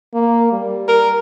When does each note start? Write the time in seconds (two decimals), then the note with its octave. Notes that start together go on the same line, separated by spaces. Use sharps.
0.14 A#3
0.52 G3
0.88 A#4